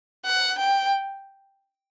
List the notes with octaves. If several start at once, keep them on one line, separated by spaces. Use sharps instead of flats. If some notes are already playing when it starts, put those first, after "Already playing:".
F#5
G5